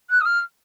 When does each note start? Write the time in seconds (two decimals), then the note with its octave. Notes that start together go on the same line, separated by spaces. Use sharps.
0.09 F#6
0.20 D#6
0.25 F6